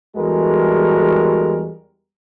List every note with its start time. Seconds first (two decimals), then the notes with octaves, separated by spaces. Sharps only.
0.16 E2 G3 G#3 F#4 A4 A#4